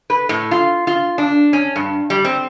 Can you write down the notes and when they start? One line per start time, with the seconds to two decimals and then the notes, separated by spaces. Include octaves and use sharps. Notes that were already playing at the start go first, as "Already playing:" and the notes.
0.10 B4
0.29 A2
0.51 F4
0.87 F4
1.18 D4
1.53 C#4
1.76 G2
2.10 G3
2.25 C4